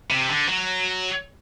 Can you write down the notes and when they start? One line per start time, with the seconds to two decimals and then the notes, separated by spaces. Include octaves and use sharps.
0.11 C3
0.29 D3
0.49 F#3